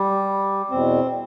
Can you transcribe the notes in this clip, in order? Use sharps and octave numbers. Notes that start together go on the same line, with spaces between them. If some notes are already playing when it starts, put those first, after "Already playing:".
Already playing: G3
E2 B2 C4